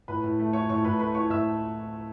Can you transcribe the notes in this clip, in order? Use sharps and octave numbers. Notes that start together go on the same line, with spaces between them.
A2 B4 B5
A2
A3
E4 C#5 C#6
A2 C#5 C#6
A2 B4 B5
A3 B4 B5
E4 C#5 C#6
A2 E5 E6